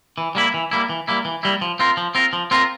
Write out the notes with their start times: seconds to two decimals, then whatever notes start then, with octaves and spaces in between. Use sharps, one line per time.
0.18 E3
0.35 G3 A#3 E4
0.54 E3
0.71 G3 A#3 E4
0.89 E3
1.08 G3 A#3 E4
1.25 E3
1.43 G3 A#3 E4
1.61 F3
1.79 C4 F4 A#4
1.97 F3
2.15 C4 F4 A#4
2.33 F3
2.51 C4 F4 A#4